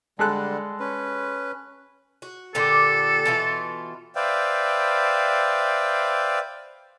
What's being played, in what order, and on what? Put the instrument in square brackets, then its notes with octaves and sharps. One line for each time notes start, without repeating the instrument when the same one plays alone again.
[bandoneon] D3 G3 [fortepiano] G#3 A4 F#6
[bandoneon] C#4 B4
[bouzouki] F#4
[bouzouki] A#2 D3 G4 [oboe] A4
[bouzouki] B2 E3 F4
[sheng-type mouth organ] B4 C5 D5 E5 F5 G5